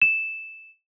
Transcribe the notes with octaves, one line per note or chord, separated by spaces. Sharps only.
E7